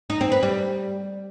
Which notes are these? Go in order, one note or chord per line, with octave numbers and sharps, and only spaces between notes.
D#4
C4
B4
G3